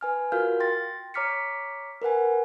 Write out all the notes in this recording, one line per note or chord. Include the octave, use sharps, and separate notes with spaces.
B4 G#5 F6
F4 F#4 A#4 F5 F6 G6
G5 C6 A6 A#6
C#5 A#5 D6 F6 B6 C#7
A#4 B4 F#5 G#5